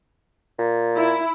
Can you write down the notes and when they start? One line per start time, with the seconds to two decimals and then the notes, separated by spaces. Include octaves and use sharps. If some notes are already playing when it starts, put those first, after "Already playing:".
0.59 A#2
0.99 E4